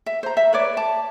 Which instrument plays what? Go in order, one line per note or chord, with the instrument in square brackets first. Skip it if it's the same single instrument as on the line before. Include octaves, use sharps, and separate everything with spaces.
[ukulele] E5
C5 A#5
E5
B4 C#5 D5
A5